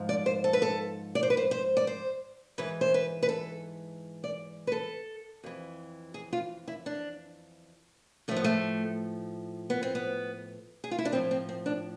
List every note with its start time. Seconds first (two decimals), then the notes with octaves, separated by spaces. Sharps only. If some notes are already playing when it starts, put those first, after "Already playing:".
Already playing: G#2 F3
0.09 D5
0.26 C5
0.44 A4
0.53 B4
0.62 A4
1.15 D5
1.23 C5
1.30 B4
1.37 C5
1.51 C5
1.77 D5
1.87 C5
2.58 G#2 E3 B4
2.81 C5
2.94 B4
3.23 B4
3.29 A4
4.24 D5
4.67 B4
4.72 A4
5.44 F2 E3
6.14 G#4
6.33 F4
6.68 E4
6.86 D4
8.28 A2 F3 A3
8.37 B3
8.44 A3
9.70 B3
9.83 C4
9.95 B3
10.84 G#4
10.91 F4
10.99 E4
11.05 D4
11.12 A2 F3 C4
11.31 C4
11.49 C4
11.66 D4